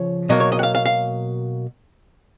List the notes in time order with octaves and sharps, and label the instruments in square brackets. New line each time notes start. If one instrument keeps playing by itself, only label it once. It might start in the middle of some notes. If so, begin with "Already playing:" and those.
Already playing: [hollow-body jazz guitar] C#3 F3 C#5
B2 F#3 A#3 D#5
C#5
D#5
F#5
F5
F5
F5